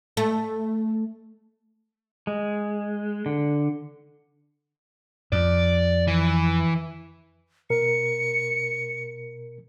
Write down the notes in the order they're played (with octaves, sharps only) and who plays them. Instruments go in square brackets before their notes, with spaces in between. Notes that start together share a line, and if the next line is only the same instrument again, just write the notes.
[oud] A3
[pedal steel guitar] G#3
D3
[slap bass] F2 [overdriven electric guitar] D5
[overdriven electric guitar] E3
[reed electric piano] B2 A#4 [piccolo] C#7